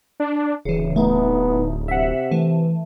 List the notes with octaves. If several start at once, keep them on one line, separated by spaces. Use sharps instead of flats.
D4
D1 C#3 E3
A3 B3 D#4
C3 E5 F#5
E3 A3